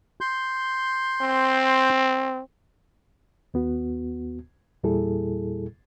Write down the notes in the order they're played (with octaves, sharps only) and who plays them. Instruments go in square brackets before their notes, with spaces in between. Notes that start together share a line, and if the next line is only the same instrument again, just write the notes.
[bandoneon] C6 G6
[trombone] C4
[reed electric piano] D#2 B3 F#4
E2 A#2 G3 E4 G#4 A4